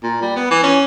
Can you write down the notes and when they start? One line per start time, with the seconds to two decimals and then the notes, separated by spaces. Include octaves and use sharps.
0.04 A#2
0.22 G3
0.36 B3
0.51 E3
0.63 C#4